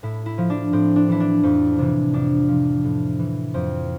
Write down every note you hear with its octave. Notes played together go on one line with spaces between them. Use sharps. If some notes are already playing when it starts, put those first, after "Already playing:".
A2 E4
E4
F3
D4
A2 C4
D4
E3 E4
D4
F2 C4
C3 E3 D4
F2 D4
C3 F3
A2
E3
F2 C4